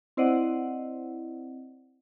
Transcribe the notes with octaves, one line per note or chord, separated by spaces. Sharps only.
C4 E4 C5 D5 D#5 F#5